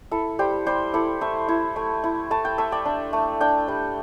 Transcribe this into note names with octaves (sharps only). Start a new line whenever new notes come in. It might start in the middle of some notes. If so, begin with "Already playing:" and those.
E4 A4
G3 G4 C5
G3 G4 C5
E4 A4 D5
A3 C5 E5
E4
A3
E4
A3 A5
G5
A3 E5
D5 G5
D4
A3
D4 D5 G5
G3